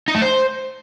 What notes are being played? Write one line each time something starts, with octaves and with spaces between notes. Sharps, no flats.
D#4
A3
C5